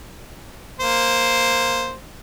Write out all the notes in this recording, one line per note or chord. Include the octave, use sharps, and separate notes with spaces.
A#3 C5